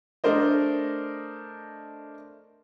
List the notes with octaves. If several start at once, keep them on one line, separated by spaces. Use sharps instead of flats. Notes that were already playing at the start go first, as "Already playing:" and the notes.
A3 D4 A#4 C5 D#5